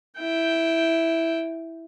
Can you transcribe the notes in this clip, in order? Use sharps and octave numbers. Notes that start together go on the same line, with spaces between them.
E4 G5